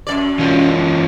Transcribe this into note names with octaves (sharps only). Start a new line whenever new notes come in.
F#2 D5
E3 C#4 F4